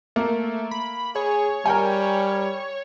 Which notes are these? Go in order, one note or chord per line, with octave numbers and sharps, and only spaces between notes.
A3 A#3
B5
G#4 C#5
G3 A#4 G5 G#5